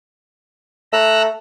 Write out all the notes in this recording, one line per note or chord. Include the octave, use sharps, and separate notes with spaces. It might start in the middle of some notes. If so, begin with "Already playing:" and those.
A3 A#5 E6 F#6